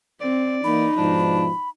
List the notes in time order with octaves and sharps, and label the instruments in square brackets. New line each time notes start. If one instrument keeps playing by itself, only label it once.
[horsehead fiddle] C4 [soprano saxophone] D5
[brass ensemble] E3 A#3 [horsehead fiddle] D#4 [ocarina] B5
[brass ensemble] G#2 B2 F3 [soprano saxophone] D4